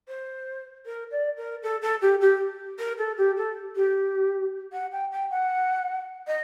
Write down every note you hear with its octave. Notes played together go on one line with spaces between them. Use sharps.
C5
A#4
D5
A#4
A4
A4
G4
G4
A#4
A4
G4
A4
G4
F#5
G5
G5
F#5
D#5